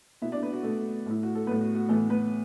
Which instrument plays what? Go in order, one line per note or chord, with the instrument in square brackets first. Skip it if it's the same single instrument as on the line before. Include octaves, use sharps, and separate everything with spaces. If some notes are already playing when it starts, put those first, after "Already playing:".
[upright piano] B2 B3 E4 E5
D4 D5
B3 B4
F#4
B2 A3 B3 A4
A2 A3 E4
F#4
A4
A2 A3 B3 B4
F#4
F#4
A2 E3 A3 B3 A4
B3 B4